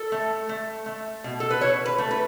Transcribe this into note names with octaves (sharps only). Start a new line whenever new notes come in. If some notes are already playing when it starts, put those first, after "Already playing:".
Already playing: A4
A3
A3
A3
B2
A4
B4
B2 C#5
B4
A3
B4